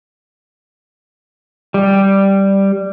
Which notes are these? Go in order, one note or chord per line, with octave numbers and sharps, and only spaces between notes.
G3